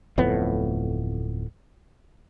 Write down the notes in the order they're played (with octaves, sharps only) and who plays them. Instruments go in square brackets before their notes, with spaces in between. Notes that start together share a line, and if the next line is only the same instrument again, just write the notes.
[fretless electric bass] D1 F2 A2 B3